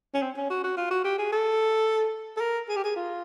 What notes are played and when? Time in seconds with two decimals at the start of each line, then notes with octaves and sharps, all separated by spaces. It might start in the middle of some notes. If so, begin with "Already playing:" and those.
0.14 C#4
0.22 C4
0.37 C#4
0.50 F#4
0.64 F#4
0.77 F4
0.91 F#4
1.04 G4
1.18 G#4
1.32 A4
2.37 A4
2.41 A#4
2.69 G#4
2.76 G4
2.84 G#4
2.96 F4